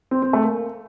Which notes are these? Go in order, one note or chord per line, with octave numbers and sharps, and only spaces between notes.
C4
C4
A3
A#3